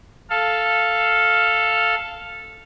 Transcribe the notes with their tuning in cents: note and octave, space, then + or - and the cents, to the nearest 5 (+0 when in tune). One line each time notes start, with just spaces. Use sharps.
A4 +0 F5 +0